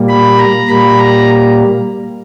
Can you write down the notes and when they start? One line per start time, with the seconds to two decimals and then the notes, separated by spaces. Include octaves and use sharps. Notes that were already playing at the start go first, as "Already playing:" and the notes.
Already playing: A#2 G3 A#3
0.09 B5
0.39 A#5
0.68 A#2 G3 A#3 B5
0.99 A#5